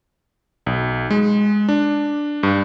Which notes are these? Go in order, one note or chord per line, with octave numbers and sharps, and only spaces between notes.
B1
G#3
D4
G2